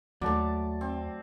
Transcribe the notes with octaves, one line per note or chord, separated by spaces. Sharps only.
D#2 F#3 A3 D5 A5
C4